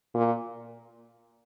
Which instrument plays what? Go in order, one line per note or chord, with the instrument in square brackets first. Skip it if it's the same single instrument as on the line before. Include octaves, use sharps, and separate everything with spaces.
[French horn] A#2